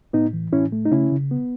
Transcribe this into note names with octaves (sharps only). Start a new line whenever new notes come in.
A2 B3 D#4
E3
A2 C#4 E4
A3
D#4
C#3 C#4 E4
C#3
B3